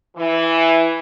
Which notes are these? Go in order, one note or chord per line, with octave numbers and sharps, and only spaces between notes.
E3